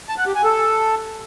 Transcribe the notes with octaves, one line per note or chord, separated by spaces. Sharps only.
A5
F#5
G4
G#5
A4